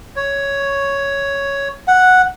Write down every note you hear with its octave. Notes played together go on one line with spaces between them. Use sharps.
C#5
F#5